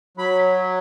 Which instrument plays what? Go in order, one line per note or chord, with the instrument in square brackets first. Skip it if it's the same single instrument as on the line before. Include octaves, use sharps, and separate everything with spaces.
[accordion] F#3 B5